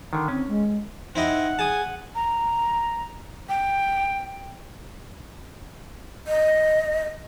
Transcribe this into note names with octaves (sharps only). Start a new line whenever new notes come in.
D3 D#3
C4 C#4
G#3
C4 D#4 E4 D#5 F#5
G#4 G#5 A5 D#6
A#5
G5
D#5